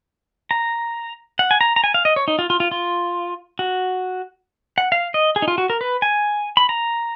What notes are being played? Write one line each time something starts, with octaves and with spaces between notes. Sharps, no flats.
A#5
F#5
G#5
A#5
A#5
G#5
F5
D#5
C#5
D#4
F4
F4
F4
F4
F#4
F#5
F5
D#5
G#4
D#4
F4
F#4
A#4
B4
G#5
B5
A#5